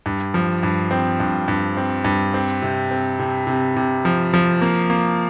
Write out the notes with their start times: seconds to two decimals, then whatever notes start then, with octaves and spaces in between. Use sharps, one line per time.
0.06 G2
0.34 F3
0.63 G2
0.91 C4
1.20 G2
1.48 G2
1.77 C4
2.05 G2
2.34 C4
2.62 C3
2.91 C4
3.19 C3
3.47 C3
3.76 C3
4.05 F3
4.34 F3
4.61 A#3
4.90 A#3